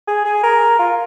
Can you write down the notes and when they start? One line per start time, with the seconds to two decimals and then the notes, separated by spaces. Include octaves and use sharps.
0.07 G#4
0.25 G#4
0.43 A#4
0.79 F4